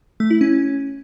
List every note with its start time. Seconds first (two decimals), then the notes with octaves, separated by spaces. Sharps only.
0.20 A3
0.30 E4
0.41 C#4